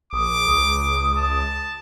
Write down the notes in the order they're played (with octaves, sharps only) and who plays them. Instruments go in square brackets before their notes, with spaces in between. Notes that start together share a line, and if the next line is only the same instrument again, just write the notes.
[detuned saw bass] A#1 [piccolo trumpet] D6 [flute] D#6
[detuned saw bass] C#2 [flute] D#6
[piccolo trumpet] A5